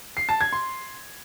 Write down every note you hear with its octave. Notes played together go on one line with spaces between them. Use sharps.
C7
A5
G#6
C6